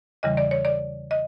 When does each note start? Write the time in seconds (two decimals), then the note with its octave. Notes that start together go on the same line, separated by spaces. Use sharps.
0.23 E2 C#3 E3 G3 D#5
0.37 D5
0.51 C#5
0.65 D5
1.11 D#5